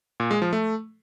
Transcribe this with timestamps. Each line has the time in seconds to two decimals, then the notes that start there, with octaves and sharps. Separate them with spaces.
0.20 A#2
0.31 G#3
0.42 F3
0.53 A3